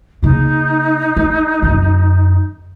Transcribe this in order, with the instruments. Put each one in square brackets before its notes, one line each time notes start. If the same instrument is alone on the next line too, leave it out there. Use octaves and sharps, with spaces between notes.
[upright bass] C#3 A#3 [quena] D#4
[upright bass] G#3
F#2 D3